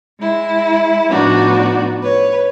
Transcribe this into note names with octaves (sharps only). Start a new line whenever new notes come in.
G#3 E4
A2 F3 B3 D4 D#4 F#4
B4 C#5